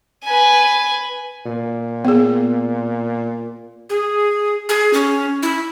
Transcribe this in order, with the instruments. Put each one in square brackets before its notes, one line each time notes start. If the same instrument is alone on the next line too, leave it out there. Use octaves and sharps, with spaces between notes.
[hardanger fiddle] B4 G#5
[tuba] A#2
[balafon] B3 G#4
[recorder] G#4
G#4
C#4
E4